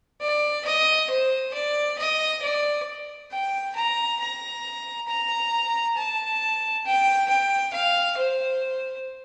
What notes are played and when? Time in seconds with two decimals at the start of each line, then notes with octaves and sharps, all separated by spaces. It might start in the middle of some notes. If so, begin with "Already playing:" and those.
0.21 D5
0.65 D#5
1.10 C5
1.53 D5
1.98 D#5
2.42 D5
3.31 G5
3.75 A#5
4.20 A#5
5.08 A#5
5.97 A5
6.86 G5
7.29 G5
7.73 F5
8.18 C5